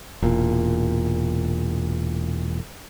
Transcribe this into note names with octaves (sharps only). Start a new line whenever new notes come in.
E1 A#2